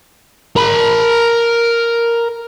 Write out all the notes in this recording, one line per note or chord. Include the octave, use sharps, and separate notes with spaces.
A#4 B5